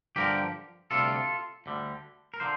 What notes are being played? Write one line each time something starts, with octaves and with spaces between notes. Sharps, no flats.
G2 D3 F3 G4 A#4
D2 C3 G3 F4 A4
D2 D3 G3
A#4
D3 F3 C5